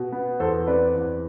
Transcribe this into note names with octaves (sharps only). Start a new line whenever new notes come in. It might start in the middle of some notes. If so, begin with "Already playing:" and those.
Already playing: B2
B3
E2 A4 C5
C4 B4 D5
E2